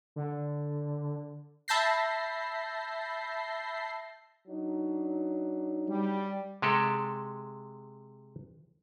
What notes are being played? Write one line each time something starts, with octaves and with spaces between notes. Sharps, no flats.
D3
E5 A5 B5 G6 A#6 C7
F#3 D4 D#4
G3
C3 G#3 G4 A4